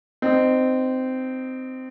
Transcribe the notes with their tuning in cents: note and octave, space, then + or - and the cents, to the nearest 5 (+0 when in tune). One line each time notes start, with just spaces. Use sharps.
C4 -15 D#4 -15